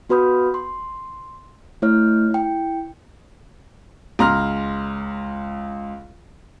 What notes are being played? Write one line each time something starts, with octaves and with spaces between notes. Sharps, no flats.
B3 F#4 B4 B5 D#6 G6
C6
A3 E4 C#5 F6
E4 G5
C#2 A#5 C6 F6